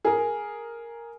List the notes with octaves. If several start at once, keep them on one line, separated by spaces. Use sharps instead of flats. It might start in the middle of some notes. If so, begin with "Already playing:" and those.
G#4 A#4